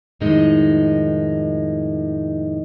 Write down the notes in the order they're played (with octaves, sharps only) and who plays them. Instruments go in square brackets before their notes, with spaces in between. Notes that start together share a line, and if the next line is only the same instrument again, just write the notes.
[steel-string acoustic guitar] F2 A2 D#3 G#3 D#4